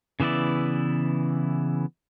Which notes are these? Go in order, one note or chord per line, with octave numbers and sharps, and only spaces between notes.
C#3 E3 B3 E4 D5